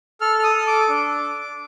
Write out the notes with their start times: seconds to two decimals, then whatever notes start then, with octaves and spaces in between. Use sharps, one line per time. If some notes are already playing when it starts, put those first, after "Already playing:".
0.21 A4 F6
0.39 F6
0.43 D#6
0.54 A4
0.67 D6
0.89 D4